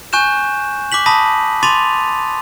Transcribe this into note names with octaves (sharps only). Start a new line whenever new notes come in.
G#5 C#6 F#6 G6 E7
D6 F#6 B6 F#7
A5 B5 D#6 A#6 B6 D#7
B5 C6 D6 A6 D#7 F7